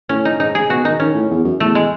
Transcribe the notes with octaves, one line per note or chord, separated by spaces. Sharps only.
A2 C#4
D#4
G#2 D#4
G#4
B2 F#4
D#3 D#4
D#3 C#4
A2
E2
F#2
E2 A3
G#3